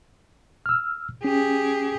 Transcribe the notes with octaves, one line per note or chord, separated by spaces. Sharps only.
E6 F6
C#4 G4 G#4